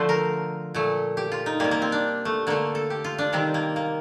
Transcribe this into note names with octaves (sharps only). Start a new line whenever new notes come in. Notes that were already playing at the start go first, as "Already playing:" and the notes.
Already playing: D3 F3 A3 C5
A#4
A#2 A3
G4
F4
D#4
C3 G3 A#3
A#3
C4
D4
A3
D3 A3 A#3
A4
G4
F4
D4
C3 D#3 G3 C4
A#3
A#3